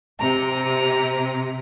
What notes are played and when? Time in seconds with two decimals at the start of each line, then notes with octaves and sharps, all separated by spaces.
0.20 C3 A#5